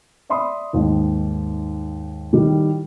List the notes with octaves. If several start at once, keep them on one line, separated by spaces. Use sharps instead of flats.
D5 E5 B5 C6 D#6
D#2 G#2 D#3
A2 D#3 G3